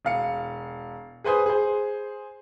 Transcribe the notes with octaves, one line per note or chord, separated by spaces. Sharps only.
E1 F5 C#7
G#4 B4 C5 G#5 D#6
G#4 C5